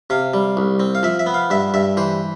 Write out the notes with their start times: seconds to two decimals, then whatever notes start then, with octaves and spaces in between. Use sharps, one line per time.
0.10 C3 F5
0.34 G3
0.57 C2
0.80 C4
0.95 F5
1.03 F3 E5
1.19 E5
1.26 B3
1.34 F5
1.50 G2 E5
1.74 G2 E5
1.97 E3 C5